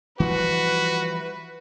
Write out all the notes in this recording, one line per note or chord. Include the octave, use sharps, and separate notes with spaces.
E3 F3 G3 F#4 B4